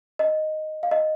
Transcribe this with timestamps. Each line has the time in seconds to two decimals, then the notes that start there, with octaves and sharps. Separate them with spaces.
0.19 D#5
0.83 F5
0.91 D#5